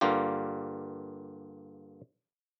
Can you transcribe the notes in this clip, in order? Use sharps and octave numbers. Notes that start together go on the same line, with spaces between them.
G2 D3 A#3 F4 G4